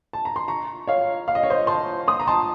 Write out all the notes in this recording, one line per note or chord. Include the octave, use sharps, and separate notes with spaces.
A5
A#5
C6
A#5 C#6
C#5 F5
F5
D#5
C#5
C5 D#5
A5 C6
C6 D#6
A#5
A5 C6